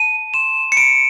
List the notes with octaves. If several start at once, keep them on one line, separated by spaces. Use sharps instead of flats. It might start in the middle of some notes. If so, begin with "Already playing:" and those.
Already playing: A5 D#7
C6 E7
C#7
B5 D7